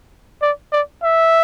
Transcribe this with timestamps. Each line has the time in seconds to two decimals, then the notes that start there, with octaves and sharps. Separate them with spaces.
0.42 D5
0.72 D5
1.03 E5